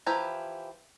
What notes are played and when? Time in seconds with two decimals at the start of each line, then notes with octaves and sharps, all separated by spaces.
0.06 E3 F3 E4 G4 A#5